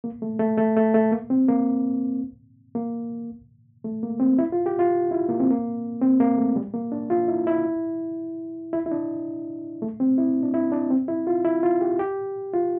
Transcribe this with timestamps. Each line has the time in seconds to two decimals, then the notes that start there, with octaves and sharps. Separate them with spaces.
0.04 A#3
0.22 A3
0.39 A3
0.57 A3
0.76 A3
0.94 A3
1.12 A#3
1.30 C4
1.49 A#3
2.75 A#3
3.84 A3
4.03 A#3
4.20 C4
4.39 E4
4.52 F4
4.66 G4
4.79 F4
5.11 E4
5.29 A#3
5.40 C4
5.50 A#3
6.01 C4
6.20 A#3
6.38 A3
6.56 G3
6.74 A#3
6.92 D4
7.10 F4
7.28 E4
7.47 E4
8.73 E4
8.86 E4
8.92 D4
9.82 A3
10.00 C4
10.18 E4
10.43 D4
10.54 E4
10.72 D4
10.90 C4
11.08 E4
11.27 F4
11.45 E4
11.63 F4
11.81 G4
11.99 G4
12.53 F4